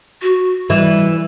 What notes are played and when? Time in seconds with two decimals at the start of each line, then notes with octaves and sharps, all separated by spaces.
0.22 F#4
0.70 E3 G3